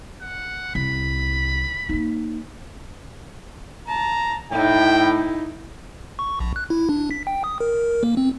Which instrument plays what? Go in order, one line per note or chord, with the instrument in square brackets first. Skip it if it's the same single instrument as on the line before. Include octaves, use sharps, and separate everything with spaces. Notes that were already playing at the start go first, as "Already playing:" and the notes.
[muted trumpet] F#5
[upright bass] C2 [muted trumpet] B5
[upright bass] A#3 D#4
[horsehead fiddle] A5 [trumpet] A#5
[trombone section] A2 [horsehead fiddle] D#4 E4 [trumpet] G5
[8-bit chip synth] C#6
A#1
F#6
E4
D4
B6
G5
D#6
A#4
A#3
C4